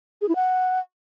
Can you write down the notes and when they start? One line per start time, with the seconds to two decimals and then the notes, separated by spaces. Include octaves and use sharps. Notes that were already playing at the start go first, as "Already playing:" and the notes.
0.21 G#4
0.28 E4
0.35 F#5